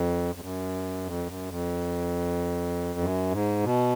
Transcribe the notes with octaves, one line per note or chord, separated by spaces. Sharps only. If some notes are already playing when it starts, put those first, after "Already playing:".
Already playing: F2
F2
F#2
F2
F#2
F2
F#2
G#2
B2